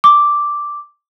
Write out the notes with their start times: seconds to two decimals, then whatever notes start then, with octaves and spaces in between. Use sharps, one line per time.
0.04 D6